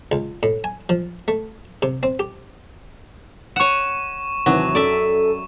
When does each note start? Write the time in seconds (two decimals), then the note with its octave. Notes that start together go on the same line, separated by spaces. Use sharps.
0.12 C#2
0.43 A2
0.64 G#5
0.89 F3
1.28 A3
1.82 C3
2.03 C4
2.19 G4
3.56 C#5 F#5 C#6 E7
4.46 D#2 C3 E3 F#3
4.75 F#2 A4 D5 E5